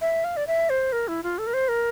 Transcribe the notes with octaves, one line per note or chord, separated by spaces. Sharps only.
E5
F5
D5
E5
C5
A#4
E4
F4
A4
A#4
C5
A#4